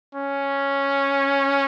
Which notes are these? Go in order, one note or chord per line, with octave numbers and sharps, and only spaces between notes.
C#4